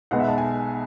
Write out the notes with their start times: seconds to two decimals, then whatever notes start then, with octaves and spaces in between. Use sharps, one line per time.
0.11 B1 B2 G#3 B3 F#5
0.20 E5
0.29 A5
0.38 G#5